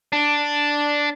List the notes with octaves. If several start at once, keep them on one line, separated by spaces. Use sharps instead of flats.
D4